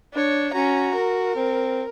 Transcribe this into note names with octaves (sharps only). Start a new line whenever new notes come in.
D4 C#5
C#4 F#4 A#5
A#4
C4